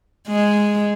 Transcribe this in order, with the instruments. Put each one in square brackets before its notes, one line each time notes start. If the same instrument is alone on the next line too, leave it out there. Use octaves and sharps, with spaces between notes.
[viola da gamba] G#3